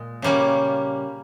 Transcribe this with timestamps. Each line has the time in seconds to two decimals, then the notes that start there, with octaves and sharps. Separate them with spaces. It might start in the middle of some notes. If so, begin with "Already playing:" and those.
Already playing: A#2 G#3
0.22 C#3 G3 A#3 C#4